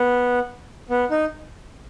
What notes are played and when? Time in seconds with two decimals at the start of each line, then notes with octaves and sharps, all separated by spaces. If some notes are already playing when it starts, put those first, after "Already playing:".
Already playing: B3
0.90 B3
1.10 D#4